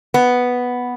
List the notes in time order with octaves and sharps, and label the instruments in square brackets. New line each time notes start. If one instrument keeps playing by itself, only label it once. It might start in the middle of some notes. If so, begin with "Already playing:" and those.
[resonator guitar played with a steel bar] B3